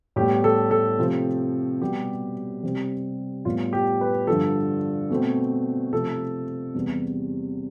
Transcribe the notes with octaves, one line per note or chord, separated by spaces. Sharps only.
A2 G3 B3 G4
A4
A4
C3 F3 A3 C4
B2 G3 B3 G4
C3 G3 C4
A2 G3 B3 F4
G4
B4
G2 D3 F3 A4
B2 A3 C4
C3 F3 A3 A4
E2 C3 G3 B3